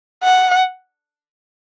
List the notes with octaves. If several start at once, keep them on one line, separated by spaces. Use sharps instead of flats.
F#5